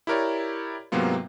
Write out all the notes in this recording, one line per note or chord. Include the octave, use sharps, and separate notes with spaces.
E4 G4 A#4 C#5 D5
G#2 C3 F#3 A#3 B3 F4